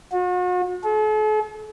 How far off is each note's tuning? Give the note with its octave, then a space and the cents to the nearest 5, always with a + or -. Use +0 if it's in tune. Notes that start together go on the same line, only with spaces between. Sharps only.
F#4 -40
A4 -45